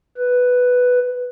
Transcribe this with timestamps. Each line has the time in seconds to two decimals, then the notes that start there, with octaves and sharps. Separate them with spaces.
0.17 B4